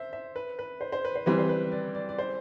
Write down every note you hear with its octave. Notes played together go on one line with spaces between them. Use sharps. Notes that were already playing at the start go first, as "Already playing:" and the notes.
Already playing: C5 E5
E5
B4
B4
C5
C5
B4
C5
E3 G3 C4 B4
C5
B4
D5
D5
D5
C5